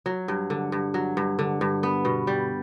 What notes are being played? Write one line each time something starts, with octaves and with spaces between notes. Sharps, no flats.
F#3
G2
D3
G2
F#3
G2
D3
G2
B3
B2
G3